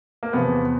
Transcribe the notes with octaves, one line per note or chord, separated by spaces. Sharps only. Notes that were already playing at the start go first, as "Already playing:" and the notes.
A#3
E2 C3 F3 B3